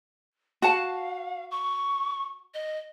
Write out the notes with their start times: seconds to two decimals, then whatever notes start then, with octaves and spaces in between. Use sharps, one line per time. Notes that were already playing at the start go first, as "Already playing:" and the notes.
0.62 F#4 F5 F#5 A5
1.51 C#6
2.54 D#5